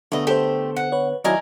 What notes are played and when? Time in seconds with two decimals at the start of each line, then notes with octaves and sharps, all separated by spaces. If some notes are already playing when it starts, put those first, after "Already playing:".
0.12 D3 A3 B3 D#5
0.27 A3 G4 A4 C5
0.76 F#5
0.92 B4 C#5
1.24 D#3 F#3 A3 E4 A#4 D5 D#5 G#5